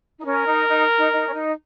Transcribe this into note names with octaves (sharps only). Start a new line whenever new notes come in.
D#4
C#4 A#4
D#4
D#4
D#4
D#4
C#4
D#4